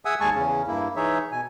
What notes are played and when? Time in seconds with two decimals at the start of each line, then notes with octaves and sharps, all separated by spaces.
0.05 G#4 E5 F#5 G#5 D#6 E6
0.20 D#2 G#3 G#4 G#5 A5 C#6
0.35 E2 C#3 C#4
0.67 G2 A#3 E4
0.96 E3 D#4 G#4 C#5 E5
1.32 B2 G#5